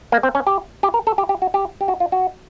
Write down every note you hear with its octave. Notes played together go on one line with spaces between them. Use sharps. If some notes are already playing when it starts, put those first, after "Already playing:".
A#3
C4
C#4
G4
G4
A#4
A4
G4
G4
F#4
G4
G4
F#4
F4
F#4